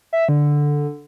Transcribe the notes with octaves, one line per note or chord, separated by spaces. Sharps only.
E5
D3